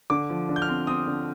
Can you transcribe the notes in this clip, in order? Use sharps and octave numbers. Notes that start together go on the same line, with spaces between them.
D3 D6
F3
D3
G6
F6
C4
C4 D#6
D3